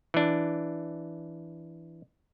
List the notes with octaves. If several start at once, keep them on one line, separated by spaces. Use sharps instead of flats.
E3 D4